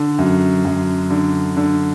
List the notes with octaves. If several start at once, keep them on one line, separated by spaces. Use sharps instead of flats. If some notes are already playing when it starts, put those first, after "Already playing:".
Already playing: D3
F#2
F#2
D3
D3